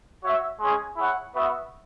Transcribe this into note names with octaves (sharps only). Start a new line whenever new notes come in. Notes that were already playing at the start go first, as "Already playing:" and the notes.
F#4 C#5 E5
G#3 C#4 G#4
E4 G#4 C#5 F#5
B3 F#4 B4 E5